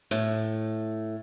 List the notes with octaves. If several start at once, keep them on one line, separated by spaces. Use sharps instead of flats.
A2